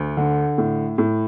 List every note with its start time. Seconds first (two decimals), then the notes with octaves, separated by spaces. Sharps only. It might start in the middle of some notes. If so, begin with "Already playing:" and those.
Already playing: D2
0.17 D3
0.58 A2
0.98 A2